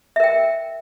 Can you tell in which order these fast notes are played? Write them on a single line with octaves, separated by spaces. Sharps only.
E5 A#4 G5